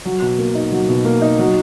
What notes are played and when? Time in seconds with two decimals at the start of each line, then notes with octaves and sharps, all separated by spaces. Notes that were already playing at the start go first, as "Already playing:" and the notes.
0.05 F#3
0.22 B2
0.38 A#3
0.55 D#4
0.72 F#3
0.89 B2
1.05 A#3
1.22 D#4
1.39 F#3